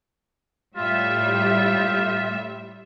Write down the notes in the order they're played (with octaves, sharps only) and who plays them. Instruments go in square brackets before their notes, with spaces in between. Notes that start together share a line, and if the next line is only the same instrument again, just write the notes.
[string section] A2 G3 E5 [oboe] F4